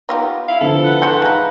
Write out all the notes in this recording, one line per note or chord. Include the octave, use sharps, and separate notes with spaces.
B3 D#4 F4 G4
E4 F5
D3 E3 F3 A4
B4 F#5
G#3 A3 G#5 C6 G6 C#7
G#3 D#4 F5